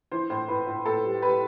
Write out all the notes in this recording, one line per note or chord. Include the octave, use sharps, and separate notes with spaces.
E3 C5
A2 C5
A2 B4
A2
A2 A4
G3
G3 B4